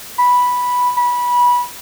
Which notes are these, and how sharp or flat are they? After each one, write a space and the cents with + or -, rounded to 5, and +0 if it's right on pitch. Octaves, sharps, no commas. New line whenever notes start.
B5 -5
B5 -20